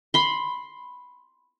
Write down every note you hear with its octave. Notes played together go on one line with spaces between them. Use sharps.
B5 C6